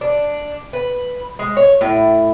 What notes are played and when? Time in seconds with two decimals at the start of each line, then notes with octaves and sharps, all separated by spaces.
0.01 D4
0.73 B4
1.39 G#3
1.57 C#5
1.81 A2